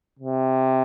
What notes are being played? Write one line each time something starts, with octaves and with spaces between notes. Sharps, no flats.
C3